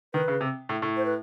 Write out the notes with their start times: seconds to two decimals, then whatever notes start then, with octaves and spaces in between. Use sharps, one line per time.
0.14 D#3 B4
0.28 C#3
0.41 C3
0.69 A2
0.82 A2
0.97 C5
1.05 B4